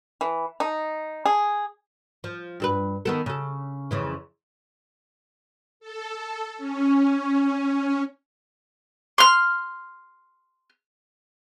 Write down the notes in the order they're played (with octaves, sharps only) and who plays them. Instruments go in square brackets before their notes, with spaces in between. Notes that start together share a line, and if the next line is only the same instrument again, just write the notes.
[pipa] E3
D#4
G#4
[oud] F3
G2 A4 B4
D#3 B3 A4
C#3 A4
F2 C#3 E3
[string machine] A4
C#4
[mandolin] C6 F6